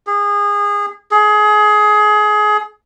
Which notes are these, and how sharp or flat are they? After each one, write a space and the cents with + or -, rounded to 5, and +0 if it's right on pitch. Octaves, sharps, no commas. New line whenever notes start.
G#4 -25
G#4 +25